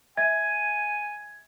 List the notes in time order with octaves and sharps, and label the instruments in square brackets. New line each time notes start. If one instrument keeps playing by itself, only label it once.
[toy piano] E5 [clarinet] G#5 [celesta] G#6